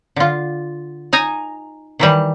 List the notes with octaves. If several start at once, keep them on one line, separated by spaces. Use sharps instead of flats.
D3 F4
D#4 G#5 A#5
D#3 E3 G3